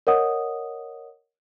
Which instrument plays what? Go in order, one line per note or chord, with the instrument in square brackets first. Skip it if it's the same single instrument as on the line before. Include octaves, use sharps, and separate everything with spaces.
[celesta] A#4 C#5 D#5 F#5 D#6